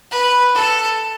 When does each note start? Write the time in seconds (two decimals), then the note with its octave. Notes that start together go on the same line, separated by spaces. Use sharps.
0.12 B4
0.55 A4